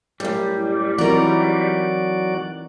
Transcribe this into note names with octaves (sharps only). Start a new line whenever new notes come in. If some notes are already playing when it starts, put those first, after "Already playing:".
F#2 A2 G3
E3 F#3 C4 D#4 E4 F#4 A#4 D5